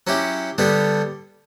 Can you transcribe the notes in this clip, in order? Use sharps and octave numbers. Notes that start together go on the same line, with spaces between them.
F#3 C#4 E4 G4
D3 G3 B3 D4 G4